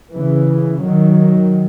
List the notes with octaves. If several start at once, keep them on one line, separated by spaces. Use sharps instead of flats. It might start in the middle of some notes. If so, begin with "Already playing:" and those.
C#3 E3
D#3 F#3